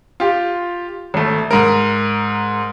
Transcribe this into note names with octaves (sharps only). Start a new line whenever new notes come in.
F4 G4
G#1 A3
G#2 A#4